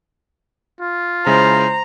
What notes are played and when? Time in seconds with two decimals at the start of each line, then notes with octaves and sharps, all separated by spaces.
0.80 F4
1.26 C#3 G#3 E4 C5 A#5